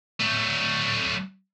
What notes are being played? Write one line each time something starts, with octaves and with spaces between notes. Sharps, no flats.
F#3 A3